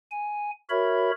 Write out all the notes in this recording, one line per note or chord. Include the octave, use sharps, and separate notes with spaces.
G#5
F#4 A#4 C#5 E5 B5